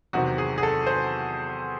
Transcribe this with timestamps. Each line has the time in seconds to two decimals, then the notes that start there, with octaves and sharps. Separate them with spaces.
0.13 E2 C3 D#3 F#3 C4 F#4
0.38 G#4
0.58 G#4
0.63 A4
0.87 C5